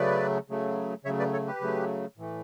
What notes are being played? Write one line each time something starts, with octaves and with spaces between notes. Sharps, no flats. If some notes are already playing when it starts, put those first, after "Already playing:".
Already playing: C#3 F#3 A3 B4 D5
C#3 F#3 A3
C#3 F#3 A3 C#5 E5
B4 D5
A4 C#5
G4 B4
C#3 F#3 A3
A2 E3 A3